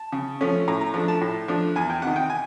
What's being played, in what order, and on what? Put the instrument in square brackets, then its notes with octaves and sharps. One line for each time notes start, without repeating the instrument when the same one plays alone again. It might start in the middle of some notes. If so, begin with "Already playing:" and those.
Already playing: [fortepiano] A5
C#3
F3 A3 C#4
A2 A#5
A#5
F3 A3 D4 A#5
A5
A2
F3 A3 D4
E2 G#5
G5
C3 D#3 F#5
G5
G#5